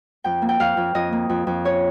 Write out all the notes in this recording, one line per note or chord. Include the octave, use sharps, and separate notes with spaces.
F2 G5
A#3
G5
F2 F5
F2
F2 D#5
A#3
F2
F2
C#4 C#5